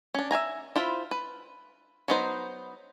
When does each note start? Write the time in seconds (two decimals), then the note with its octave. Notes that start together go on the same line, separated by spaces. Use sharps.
0.14 C#4 D4
0.31 E5 F5 G#5 A#5
0.76 E4 F4 C5 B5
1.11 B4
2.08 F#3 B3 D#4 B4 C5